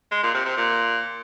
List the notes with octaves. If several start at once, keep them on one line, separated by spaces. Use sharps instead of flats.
G#3
A#2
C3
C3
A#2